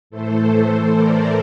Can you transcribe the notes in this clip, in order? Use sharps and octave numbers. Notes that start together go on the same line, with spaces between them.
A2 E3 A3 A4 C5
A#4 D5